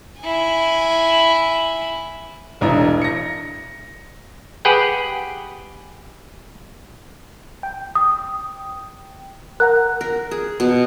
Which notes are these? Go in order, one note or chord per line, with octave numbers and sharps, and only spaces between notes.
E4 G#5
E1 A1 D4 A#5
A#6 C#7
G4 G#4 B4 F#5 G5
G5
D#6
A#4 F#5 A#5 F#6
A#4
G#4
B2